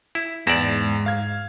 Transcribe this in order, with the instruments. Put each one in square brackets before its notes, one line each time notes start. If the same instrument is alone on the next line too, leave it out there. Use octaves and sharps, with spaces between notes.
[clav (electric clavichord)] E4
[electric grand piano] E2 A#6 E7 [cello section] G#2 [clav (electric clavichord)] E4 D5
[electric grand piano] F5 G#6